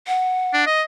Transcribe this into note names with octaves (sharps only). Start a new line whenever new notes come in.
F#5
D4
D#5